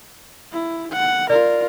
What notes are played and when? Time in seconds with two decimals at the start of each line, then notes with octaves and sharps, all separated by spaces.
0.52 E4
0.92 F#5
1.30 F4 A#4 D5